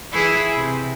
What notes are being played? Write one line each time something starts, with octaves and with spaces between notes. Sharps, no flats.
E3 E4 G#4
C3